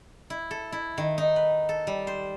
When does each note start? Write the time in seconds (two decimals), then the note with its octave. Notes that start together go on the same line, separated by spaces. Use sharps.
0.30 E4
0.51 A4
0.72 E4
0.98 D#3
1.18 D#4
1.36 B4
1.69 A4
1.87 G3
2.07 C5